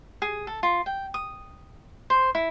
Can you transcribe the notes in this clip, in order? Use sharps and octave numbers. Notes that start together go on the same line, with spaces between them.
G#4
A4
F4
G5
D#6
C5
E4